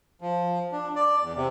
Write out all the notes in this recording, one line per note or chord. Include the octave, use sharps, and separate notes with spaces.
F3
D4
D5
E2
C3